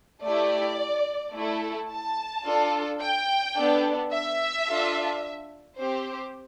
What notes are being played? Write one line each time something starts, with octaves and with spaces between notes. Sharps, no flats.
A3 E4 G4 D5
A3 E4 A4
A5
D4 F4 A4
G5
B3 D4 A4
E5
D4 F4 A4
C4 G4 C5